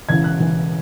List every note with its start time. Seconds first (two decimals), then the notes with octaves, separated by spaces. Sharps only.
0.09 E1 E2 C#3 E3 G#6
0.24 F#6
0.40 E1 E2 C#3 E3